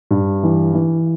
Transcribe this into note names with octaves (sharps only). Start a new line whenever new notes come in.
G2
E3
E3